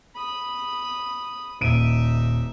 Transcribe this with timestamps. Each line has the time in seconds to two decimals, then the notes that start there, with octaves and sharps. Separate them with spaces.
0.15 B5 D#6
1.61 D#1 D#4 E5 D7 D#7